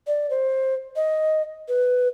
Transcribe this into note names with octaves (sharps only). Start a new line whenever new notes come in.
D5
C5
D#5
B4